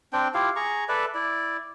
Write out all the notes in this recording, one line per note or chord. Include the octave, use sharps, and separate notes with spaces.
C4 D4 G5
E4 F4 G4 F5
G#4 A#5 C#6
A4 B4 D5 E5
E4 D5